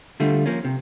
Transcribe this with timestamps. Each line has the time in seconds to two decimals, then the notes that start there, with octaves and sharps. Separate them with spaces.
0.20 D3 G3 A3 F4
0.46 F3 A#3 C#4
0.65 C3